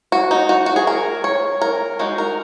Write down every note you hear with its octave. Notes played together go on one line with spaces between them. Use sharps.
F#4
D#4
F#4
F#4
G#4
A#4
C#5
A#4
G#3 D#4 F#4
A#4